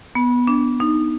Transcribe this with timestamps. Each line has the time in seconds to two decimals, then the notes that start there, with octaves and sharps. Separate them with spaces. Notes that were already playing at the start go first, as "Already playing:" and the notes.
0.15 B3
0.47 D4
0.80 D#4